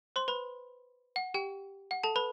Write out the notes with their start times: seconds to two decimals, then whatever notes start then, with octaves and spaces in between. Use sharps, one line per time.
0.16 C5 C6
0.28 B4 B5
1.16 F#5
1.34 G4 G5
1.91 F#5
2.04 A4 A5
2.16 B4 B5